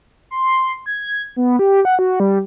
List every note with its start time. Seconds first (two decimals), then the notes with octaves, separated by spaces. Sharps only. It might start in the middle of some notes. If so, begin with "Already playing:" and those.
0.31 C6
0.86 G#6
1.36 B3
1.59 G4
1.85 F#5
1.99 F#4
2.20 G3